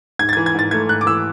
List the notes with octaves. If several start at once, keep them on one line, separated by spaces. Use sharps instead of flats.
G#2 G#6
A6
E3 G#6
G#6
G#2 A6
A3 G#6
G#2 F#6
D6
E3 E6